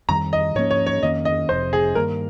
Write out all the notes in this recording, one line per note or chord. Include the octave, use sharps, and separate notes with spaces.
F2 D#3 G3 A#5
D#5
G#2 F3 A#3 C#4 C#5
C#5
C#5
F2 D#3 A#3 C#4 D#5
D#5
F1 F2 C3 C5
G#4
G2 D#3 A#3 A#4